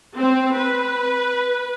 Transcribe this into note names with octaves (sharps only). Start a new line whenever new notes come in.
C4
B4